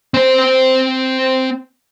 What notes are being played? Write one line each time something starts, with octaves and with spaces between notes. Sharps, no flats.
C4 C5